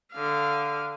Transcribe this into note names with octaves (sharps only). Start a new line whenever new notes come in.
D3 F5